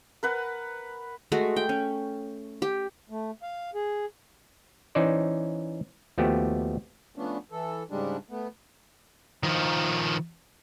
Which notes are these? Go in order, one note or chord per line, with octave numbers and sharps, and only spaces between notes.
A#4 B4 F#5
G#3 A3 F#4
G5
C#4
G4
A3
F5
G#4
E3 C#4 D#4 C5 D5
D#2 F3 A3 B3 F#4 G4
F3 A3 B3 C#4 D4
E3 A4
G#2 C#3 G3 G#3 D4
A3 B3
D#3 F3